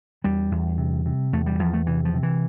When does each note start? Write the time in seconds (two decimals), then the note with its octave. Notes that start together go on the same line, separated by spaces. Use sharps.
0.24 E2 G3
0.51 E2
0.78 C3
1.06 C3
1.33 E2 A3
1.46 G3
1.59 E2 F3
1.73 A3
1.87 C3 E3
2.05 F3
2.14 C3
2.23 E3